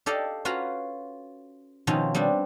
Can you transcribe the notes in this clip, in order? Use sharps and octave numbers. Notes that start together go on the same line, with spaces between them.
G4 A4 D5 D#5 F5
C#4 F4 F#4 B4 F5 A#5
B2 D#3 F3 C4 C#4
G3 B3 C4 D4